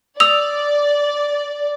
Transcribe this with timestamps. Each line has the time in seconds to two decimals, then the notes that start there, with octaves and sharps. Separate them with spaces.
0.20 D5 D#6 E6 F7